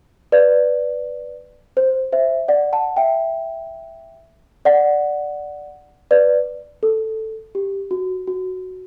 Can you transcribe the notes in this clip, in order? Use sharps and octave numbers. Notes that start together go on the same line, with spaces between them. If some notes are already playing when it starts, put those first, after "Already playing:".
B4 D5
C5
C5 E5
D5 F#5
F#5 A5
E5 G5
D5 F#5
B4 D5
A4
G4
F#4
F#4